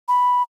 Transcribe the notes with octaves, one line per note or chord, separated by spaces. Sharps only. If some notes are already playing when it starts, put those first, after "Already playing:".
B5